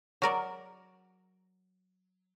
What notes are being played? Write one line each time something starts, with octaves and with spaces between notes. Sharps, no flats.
F#3 A#4 D5